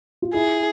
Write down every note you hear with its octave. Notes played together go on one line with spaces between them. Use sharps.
F4
E4 G#4